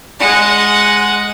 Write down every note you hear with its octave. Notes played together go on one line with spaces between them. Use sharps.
G#3 F#5